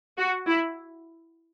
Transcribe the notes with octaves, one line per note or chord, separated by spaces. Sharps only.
F#4
E4